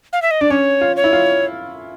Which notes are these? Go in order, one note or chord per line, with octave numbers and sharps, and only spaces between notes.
F5
E5
D#5
D4 D5
C#4 C#5
F4
C#5
E4
F4